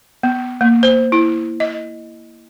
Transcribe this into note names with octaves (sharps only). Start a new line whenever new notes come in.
B3
A#3
C5
E4
D#5